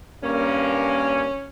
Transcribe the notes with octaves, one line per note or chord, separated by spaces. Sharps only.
G2 A#3 C#4